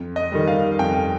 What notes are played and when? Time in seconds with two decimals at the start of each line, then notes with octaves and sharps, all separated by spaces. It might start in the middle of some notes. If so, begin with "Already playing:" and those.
Already playing: F2
0.16 D#5
0.32 D#3 G3
0.48 F5
0.79 F2 G5